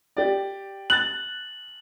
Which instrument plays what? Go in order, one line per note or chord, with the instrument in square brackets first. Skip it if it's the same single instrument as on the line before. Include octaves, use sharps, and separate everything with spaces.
[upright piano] G4 D5
[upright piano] F#6 A6 [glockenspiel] F#7